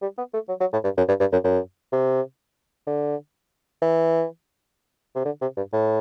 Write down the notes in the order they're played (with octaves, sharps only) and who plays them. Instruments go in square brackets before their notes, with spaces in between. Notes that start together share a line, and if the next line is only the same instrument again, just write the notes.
[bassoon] G3
B3
A3
F#3
F#3
A2
G2
F#2
G2
G2
F#2
F#2
C3
D3
E3
C3
D3
C3
G2
A2